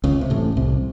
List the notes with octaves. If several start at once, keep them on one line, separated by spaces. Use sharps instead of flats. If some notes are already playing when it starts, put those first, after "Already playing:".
C#2 C#3
C3
A1 A2
C2 C3